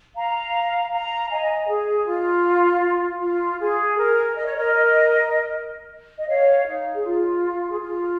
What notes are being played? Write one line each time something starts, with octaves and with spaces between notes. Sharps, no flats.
F5 A#5
F5 A#5
D#5 G#5
G#4
F4
F4
G#4
A#4
D#5
C#5
A#4 D#5
D#5
C#5 F5
D#4
G#4
F4
G#4
F4